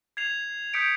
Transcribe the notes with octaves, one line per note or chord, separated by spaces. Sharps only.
G#6 C7 F7
D#6 G6 B6 C#7 D7